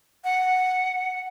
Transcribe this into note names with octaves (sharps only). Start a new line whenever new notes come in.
F#5